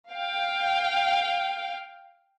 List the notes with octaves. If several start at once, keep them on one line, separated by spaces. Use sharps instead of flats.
F5 G5